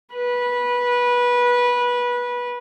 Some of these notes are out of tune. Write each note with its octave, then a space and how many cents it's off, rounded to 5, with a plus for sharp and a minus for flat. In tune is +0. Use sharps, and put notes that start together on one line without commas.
B4 -20